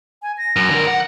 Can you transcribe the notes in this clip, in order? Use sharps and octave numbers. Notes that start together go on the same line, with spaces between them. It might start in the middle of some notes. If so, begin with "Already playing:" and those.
G#5
A#6
F#2
D3 A#4
F#5